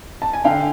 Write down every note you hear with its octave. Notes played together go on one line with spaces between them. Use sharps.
A5
G#5
D3 F5 G5